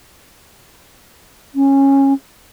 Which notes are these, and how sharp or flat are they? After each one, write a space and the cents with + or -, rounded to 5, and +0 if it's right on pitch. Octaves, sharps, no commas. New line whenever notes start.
C#4 -15